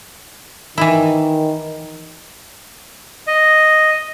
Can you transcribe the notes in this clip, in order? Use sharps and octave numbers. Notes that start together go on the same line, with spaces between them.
D#3 E3 E4
D#5